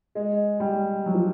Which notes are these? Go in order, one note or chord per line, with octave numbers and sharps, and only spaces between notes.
G#3
G3
F#3
F3